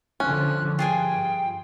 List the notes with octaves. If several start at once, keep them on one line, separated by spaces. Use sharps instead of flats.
D3 F3 C#4 F#6
G2 F4 G#4 G5 G#5